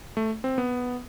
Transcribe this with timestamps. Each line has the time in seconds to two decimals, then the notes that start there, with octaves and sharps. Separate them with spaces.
0.17 A3
0.44 C4
0.58 B3